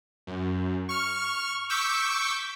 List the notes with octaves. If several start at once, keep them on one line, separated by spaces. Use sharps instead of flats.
F#2
C#6 F6
C#6 D6 E6 G6 B6